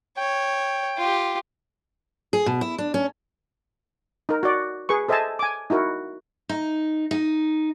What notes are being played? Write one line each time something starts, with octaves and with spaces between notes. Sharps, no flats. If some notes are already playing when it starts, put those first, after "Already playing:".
C#5 G5
F4 G4
G#4
B2
E4
D4
C#4
D#4 A#4
F#4 D5
G#4 B4 C#6
A4 C5 D#5 E5 G#5 A5
G#5 D6
D#4 E4 F#4 A#4
D#4
D#4